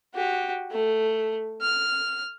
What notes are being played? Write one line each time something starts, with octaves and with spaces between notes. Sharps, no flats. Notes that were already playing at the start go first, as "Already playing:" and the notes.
F#4 G4
A3
F6